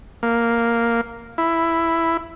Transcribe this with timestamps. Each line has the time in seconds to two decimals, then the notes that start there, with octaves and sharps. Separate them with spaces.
0.23 A#3
1.38 E4